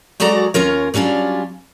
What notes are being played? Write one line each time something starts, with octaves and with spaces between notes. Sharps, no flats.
F#3 G#3 F#4 A4 D5 A#5
D#2 C#4 F4 A#4 C#5
F#3 G3 C#4 D4 F4